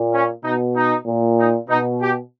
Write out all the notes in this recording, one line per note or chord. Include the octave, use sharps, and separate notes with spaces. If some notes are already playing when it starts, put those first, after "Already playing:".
Already playing: A#2
C#4
B2 D#4
D#4
A#2
D#4
B2 D#4
G4